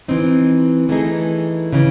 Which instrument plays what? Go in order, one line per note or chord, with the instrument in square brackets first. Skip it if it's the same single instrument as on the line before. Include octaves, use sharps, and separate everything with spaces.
[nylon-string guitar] E3 C4 D#4
E3 A3 D#4 G#4
C#3 E3